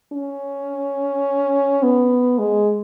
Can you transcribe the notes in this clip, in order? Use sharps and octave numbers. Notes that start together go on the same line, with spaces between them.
C#4
B3
G#3